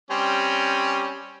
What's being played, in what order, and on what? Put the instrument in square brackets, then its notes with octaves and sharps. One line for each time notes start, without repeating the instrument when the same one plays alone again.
[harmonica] G3 C4 C#4